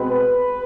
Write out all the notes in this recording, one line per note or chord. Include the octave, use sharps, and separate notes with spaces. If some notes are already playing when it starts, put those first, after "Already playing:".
Already playing: B2 G#3 C4 B4